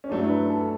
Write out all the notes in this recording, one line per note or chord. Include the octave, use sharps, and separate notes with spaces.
C#4
G2 F#3 A3 D4 E4
B4
A4
A4